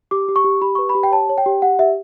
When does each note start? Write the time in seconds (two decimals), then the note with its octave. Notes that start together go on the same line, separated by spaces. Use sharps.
0.11 G4 D6
0.28 G4
0.36 C#6
0.44 G4
0.61 G4 B5
0.75 B4 C#6
0.89 B5
0.95 G4
1.03 G5
1.12 C#5 A5
1.29 C#5
1.38 G5
1.46 G4
1.62 G4 F#5
1.79 G4 E5